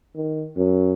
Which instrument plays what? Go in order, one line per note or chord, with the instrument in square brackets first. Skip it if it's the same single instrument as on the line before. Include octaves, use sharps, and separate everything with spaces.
[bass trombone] D#3
F#2